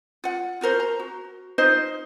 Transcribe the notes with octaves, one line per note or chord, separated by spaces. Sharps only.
F4 F#5
F4 F#4 A#4 C5
A#5
F#4
D#4 F4 C5 D#5